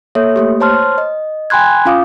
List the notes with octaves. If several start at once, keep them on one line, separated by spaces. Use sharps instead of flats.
A#3 A4 C#5 E5
A3 A#3 G4
C5 C#5 A5 C6 F6
D#5
G5 G#5 B5 C6 F#6 G#6
C#4 F4 F5 D6 D#6